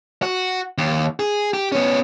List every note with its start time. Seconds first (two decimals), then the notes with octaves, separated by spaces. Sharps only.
0.22 F#4
0.78 D#2
1.20 G#4
1.53 G4
1.72 B3 C#4